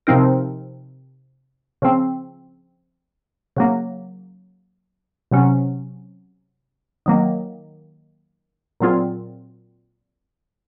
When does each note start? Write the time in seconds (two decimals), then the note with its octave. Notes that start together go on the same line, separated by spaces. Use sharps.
0.07 C3 F3 C4 D#4 A#4
1.82 C#3 F3 C4
3.57 C#3 F#3 A#3
5.31 C3 F#3 C#4
7.06 D#3 F#3 A#3
8.80 A#2 F#3 C4 F4 G#4